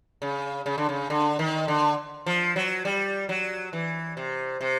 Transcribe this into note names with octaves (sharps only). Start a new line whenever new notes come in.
C#3
C#3
D3
C#3
D3
D#3
D3
F3
F#3
G3
F#3
E3
C3
C3